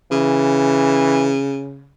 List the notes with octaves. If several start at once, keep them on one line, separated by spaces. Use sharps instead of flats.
C#3 E3